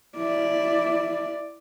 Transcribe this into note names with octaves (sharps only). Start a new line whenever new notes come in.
E4 D5